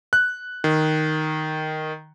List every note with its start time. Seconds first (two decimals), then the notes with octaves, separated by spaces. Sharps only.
0.13 F#6
0.64 D#3